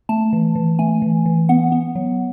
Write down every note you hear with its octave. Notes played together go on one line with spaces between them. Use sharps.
A3 A5
E3
E3
A3 G#5
E3
E3
B3 F#5
B3
F#3